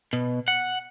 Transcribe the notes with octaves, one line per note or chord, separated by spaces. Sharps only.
B2
F#5